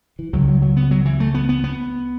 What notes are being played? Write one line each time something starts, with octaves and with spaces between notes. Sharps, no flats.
E3
C#2 C#3 F#3
F#3
F#3
B3
F#3
E3
A3
B3
B3
B3